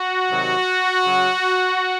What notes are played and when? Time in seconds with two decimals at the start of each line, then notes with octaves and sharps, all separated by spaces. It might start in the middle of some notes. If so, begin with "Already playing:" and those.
Already playing: F#4
0.30 C3 D#3 F#3
1.03 C#3 F#3